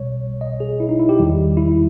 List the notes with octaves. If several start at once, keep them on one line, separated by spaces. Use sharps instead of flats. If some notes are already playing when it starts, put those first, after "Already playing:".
Already playing: B1 B2 G3 C#5
D#5
G#4
E4
D#4
E4
G4
E2 D#3 G3
E4